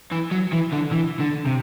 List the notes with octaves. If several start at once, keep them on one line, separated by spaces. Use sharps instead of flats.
E3
F#3
E3
D3
E3
D3
C3